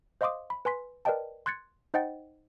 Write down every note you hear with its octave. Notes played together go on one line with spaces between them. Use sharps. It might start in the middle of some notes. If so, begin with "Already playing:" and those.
C5 D#5 F5 C6 D6 D#6
B5
B4 G#5 C6 B6
A#4 B4 D5 D#5 G5 A5
C6 F#6 G#6 A6 C#7
D#4 C5 D#5 F#5 G5 A6